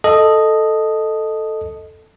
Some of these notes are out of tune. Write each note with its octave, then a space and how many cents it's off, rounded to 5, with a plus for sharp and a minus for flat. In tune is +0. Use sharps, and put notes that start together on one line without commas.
A4 +0 D#5 -5